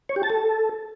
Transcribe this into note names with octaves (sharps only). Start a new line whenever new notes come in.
C#5
G4
A5
A4